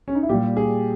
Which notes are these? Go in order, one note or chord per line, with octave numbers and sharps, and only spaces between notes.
C#4
D#4
E4
A#2 G3 G4
G#4